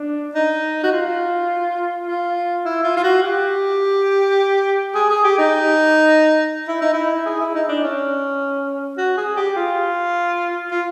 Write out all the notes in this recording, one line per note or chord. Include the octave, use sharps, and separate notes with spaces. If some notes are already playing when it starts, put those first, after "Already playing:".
Already playing: D4
D#4
F#4
F4
F4
E4
F4
F4
F#4
G4
G#4
G#4
G4
D#4
E4
D#4
E4
G#4
E4
D#4
D4
C#4
F#4
G#4
G4
F4
F4